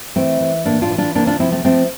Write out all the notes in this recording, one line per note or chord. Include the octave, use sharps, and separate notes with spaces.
E3 A3 C4
E3
A2 A#3 D4
D4 F4
E3
D4 F4
C3 A#3 D4
D4 F4
F3 C4 E4
A3 C4
F3 A3 C4